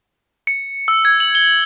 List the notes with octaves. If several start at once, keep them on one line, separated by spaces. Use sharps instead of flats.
C#7
E6
G#6
F#7
G7